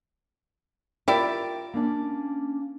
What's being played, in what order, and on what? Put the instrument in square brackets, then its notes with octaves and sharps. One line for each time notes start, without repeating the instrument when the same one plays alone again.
[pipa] E4 G4 D5 [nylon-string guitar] F4 A#4
[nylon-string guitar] A#3 C#4 D4